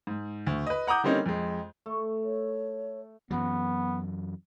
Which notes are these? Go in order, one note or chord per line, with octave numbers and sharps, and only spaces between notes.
G#2
D2
B4 D#5
F#5 A#5 D6 D#6 G6
D3 G3 A#3 C4 C#4 D#4
F2 G#3
A3
C#5
F#2 E3 F#3 B3